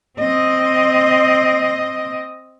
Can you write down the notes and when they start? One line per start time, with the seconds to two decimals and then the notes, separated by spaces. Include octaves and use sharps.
0.19 C4 D#5